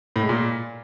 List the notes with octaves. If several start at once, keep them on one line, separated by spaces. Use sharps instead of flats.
A2
G#3
A#2